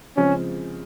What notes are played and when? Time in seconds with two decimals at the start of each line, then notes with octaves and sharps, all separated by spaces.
0.16 C#3 F3 G#3 C4 C#4